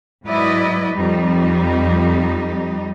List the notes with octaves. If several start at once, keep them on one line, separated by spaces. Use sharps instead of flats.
G#2 F#3 E4 B4 D5 D#5
F2 G3 D#4